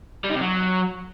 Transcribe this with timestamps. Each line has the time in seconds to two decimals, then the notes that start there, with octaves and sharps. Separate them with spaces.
0.24 G3
0.29 D#4
0.35 C3
0.40 F#3